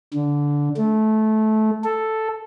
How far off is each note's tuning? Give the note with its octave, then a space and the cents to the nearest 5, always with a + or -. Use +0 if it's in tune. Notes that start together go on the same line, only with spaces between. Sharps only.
D3 -15
A3 -20
A4 +0